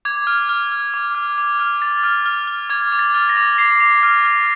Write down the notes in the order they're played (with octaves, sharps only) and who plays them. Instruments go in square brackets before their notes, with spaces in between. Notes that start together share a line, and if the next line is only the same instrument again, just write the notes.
[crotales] D6 G#6
F6
F6
F6
D6
F6
D6
F6
D6 A6
F6
F6
F6
D6 G#6
D6
A6
F6
A#6
D6
D6 C7
D6
F6
F6